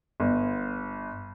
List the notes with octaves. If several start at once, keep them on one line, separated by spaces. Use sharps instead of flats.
G1